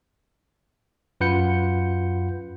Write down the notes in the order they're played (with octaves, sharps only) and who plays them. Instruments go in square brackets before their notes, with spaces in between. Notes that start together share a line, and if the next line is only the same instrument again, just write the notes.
[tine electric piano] F#2 F4 B4 F#5 G6 C#7